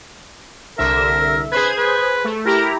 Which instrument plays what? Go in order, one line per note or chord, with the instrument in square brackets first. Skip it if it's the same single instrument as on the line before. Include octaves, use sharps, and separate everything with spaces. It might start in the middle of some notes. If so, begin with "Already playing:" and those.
[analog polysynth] C2 D3 E5 [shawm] A#4
[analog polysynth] G#4 C5 G#6 [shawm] B4
[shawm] B4
[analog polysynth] A3
[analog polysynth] E4 G4 A#5 [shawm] A#4